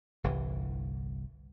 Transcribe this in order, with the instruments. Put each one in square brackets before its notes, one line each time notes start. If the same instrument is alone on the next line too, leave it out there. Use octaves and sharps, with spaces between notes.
[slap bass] G1 C2 E3